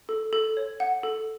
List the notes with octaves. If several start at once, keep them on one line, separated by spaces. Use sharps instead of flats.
A4
A4
C#5
F#5
A4